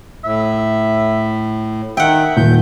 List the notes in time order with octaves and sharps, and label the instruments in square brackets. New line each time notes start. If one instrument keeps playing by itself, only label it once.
[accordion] A2 [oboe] E5
[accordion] D#3 [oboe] E5 [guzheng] F#5 G5
[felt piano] D#1 [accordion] G6